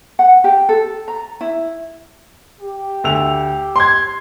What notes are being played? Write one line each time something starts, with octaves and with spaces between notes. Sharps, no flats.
F#5
G4
A4
A#5
E4
G4
D2 E6 F7
C6 G#6